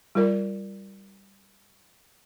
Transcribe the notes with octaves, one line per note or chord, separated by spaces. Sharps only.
G3 F4 A#4 D5